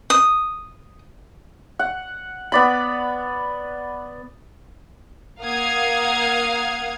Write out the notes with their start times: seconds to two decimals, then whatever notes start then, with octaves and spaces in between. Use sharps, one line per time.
0.10 D#6
1.79 F#5
2.52 B3 D5 B5
5.42 A#3 F5 F#5 D#6 G#6